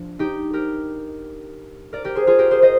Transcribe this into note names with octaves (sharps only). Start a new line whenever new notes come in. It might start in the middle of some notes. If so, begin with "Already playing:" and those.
Already playing: F3 D4
D#4 G4
G4 A#4
A#4 D5
G4 A#4
G#4 C5
F4 G#4
G4 A#4
G#4 C5
C5 D#5